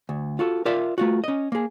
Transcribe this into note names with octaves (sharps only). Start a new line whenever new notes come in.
D2
F4 F#4 A4
F4 A#4 D5 E5 F5
A3 F4 F#4
C#4 D#5
A#3 G#4